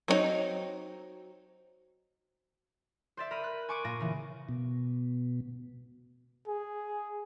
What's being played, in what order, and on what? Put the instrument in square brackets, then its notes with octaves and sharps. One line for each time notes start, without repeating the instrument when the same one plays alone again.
[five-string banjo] F#3 C4 D4 D#4 C#5
[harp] C5 D5 E5
A#4 B5 D#7
F#6
G#5 C#6 D6 C#7 D#7
A#2 A#3 A#6 D#7
C#3 E3
[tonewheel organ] B2
[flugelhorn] G#4